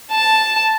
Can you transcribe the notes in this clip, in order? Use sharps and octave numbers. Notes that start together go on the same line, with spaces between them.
A5